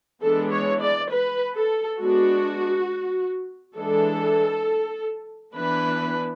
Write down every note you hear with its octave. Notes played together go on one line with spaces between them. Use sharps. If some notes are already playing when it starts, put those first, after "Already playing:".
E3 G#3 B3 D4 A4
C#5
D5
B4
A4
G#3 B3 D4 F#4
E3 G#3 D4 A4
E3 B3 D4 B4